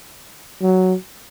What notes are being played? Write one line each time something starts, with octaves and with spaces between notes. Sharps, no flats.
F#3